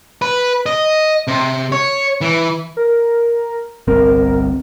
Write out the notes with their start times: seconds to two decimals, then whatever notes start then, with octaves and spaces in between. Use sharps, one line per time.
0.22 B4
0.66 D#5
1.27 C3
1.72 C#5
2.21 E3
2.77 A#4
3.87 G1 C2 C4 A#4